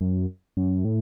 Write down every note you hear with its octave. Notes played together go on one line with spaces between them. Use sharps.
F#2
F#2
A2